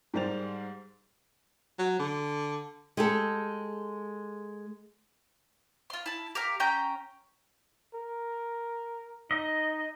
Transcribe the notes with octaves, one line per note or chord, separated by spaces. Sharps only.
G#2 G3 A#4 C5 A6 F7
F#3
D3
G#3 G4 A4
F4 C6
E4 A5
G4 A#4 F5
C#4 G5 A#5 G6
A#4
D#4 D#5